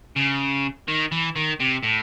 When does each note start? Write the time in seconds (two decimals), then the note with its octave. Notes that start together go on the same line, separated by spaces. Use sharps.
0.16 C#3
0.88 D#3
1.12 E3
1.36 D#3
1.60 C3
1.83 A2